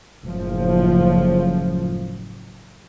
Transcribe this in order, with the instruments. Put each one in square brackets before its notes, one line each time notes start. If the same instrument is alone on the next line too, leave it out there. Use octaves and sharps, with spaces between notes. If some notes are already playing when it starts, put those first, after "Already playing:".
[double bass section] F#1 A2 F3